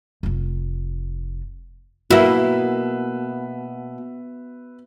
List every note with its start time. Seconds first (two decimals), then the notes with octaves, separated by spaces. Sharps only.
0.23 F1 F4
2.11 B2 A#3 E4 F#4 B4 E5